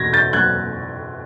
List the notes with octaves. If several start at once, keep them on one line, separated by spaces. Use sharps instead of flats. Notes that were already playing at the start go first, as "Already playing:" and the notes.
Already playing: E2 B2 G#6 A#6
G6 A6
F#3 F#6 G#6